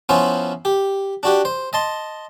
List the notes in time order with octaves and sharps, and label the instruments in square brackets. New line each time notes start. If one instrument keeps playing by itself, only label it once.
[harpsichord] F3 B3 C#4 E4 C5
G4
D4 F#4 G4
C5
D#5 A5 C6